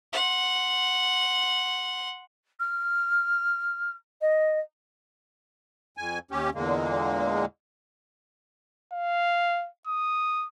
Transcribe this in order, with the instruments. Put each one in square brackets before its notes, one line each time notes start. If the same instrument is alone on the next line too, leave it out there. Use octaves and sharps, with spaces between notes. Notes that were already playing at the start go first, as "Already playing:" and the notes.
[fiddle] F#5 C6
[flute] F6
D#5
[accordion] F2 G#5
D#2 C#4 G4
E2 A#2 D3 G#3 A#3
[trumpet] F5
D#6